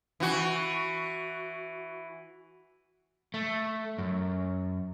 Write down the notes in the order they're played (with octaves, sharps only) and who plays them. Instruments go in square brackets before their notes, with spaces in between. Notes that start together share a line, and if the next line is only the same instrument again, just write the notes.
[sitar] E3 F#4
[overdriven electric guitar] A3
F#2